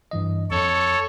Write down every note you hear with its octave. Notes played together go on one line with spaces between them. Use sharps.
G2 E3 D#5
F2 A4 C#5